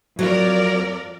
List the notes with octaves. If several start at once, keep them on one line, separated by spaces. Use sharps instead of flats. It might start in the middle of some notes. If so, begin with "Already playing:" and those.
F2 F#3 A#4 D5